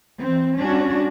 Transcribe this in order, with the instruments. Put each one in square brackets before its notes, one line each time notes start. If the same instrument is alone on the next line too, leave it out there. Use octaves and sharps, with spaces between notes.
[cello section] E3 C4
G3 C#4 D4 F#4